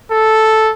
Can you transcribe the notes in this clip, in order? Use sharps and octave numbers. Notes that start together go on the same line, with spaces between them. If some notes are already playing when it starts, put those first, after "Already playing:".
A4